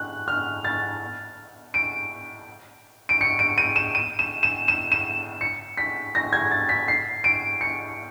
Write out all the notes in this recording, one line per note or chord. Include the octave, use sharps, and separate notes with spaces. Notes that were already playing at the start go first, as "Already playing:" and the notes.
Already playing: F#6
F6
A6
D7
D7
C#7
D7
D#7
E7
D#7
E7
E7
E7
E7
C#7
B6
A#6
G#6
A6
B6
C7
D7
C#7